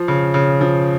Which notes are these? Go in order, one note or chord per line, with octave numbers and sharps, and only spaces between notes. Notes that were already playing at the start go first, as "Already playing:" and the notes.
Already playing: F3
C#3
C#3
F3